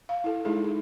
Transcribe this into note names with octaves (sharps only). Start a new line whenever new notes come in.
F5
E4 A4
G#3 D#4 E4 G#4
D#4